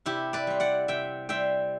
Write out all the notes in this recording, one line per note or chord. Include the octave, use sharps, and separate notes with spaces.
C3 E4 G4
B4 D5
G3 C4
D5 F#5
C3 E5 G5
G3 C4 E5 G5